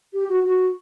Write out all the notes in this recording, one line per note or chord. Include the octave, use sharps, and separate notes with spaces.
G4
F#4
F#4